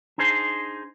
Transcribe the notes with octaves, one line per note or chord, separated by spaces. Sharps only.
D4 D#4 G#4 C5